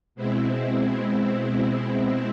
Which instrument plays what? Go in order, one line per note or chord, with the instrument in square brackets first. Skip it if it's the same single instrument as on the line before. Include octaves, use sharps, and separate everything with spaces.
[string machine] B2 G#3 C4 E4